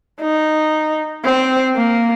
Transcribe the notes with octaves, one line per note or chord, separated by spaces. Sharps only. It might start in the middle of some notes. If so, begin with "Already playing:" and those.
D#4
C4
A#3